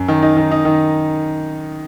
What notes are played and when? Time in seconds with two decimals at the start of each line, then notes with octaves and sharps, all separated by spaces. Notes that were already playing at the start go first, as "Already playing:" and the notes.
Already playing: F#2
0.08 D#3
0.22 D#4
0.37 D#3
0.51 D#4
0.65 D#3